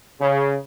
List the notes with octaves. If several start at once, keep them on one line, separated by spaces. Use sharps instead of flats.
C#3